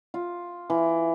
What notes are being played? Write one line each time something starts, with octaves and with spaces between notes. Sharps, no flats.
F4
E3